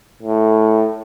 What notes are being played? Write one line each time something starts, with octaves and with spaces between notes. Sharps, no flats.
A2